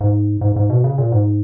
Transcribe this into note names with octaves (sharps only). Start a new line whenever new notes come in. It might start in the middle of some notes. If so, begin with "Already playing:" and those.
G#2
G#2
G#2
B2
C#3
A#2
G#2